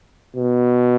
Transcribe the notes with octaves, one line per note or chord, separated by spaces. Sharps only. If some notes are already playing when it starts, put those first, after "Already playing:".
B2